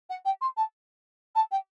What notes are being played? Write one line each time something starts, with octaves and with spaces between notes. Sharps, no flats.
F#5
G5
C6
A5
A5
G5